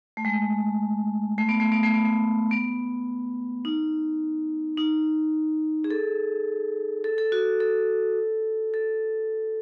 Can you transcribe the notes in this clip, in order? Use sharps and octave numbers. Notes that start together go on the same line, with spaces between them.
A3
G#3
A3
B3
A3
B3
A3
B3
A3
B3
D#4
D#4
G#4
A4
A4
A4
F#4
A4
A4